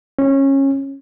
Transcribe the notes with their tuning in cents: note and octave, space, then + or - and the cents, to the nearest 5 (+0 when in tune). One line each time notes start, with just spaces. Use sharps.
C#4 -20